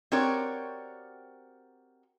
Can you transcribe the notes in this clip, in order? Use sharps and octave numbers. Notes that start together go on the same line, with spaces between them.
C4 F#4 G4 A#4 C#5 D5